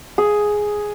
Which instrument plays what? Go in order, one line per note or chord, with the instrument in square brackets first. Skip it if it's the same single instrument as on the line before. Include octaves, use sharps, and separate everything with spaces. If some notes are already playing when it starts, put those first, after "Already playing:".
[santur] G#4